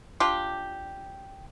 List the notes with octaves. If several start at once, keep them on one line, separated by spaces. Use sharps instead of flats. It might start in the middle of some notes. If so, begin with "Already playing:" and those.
D4 F4 G4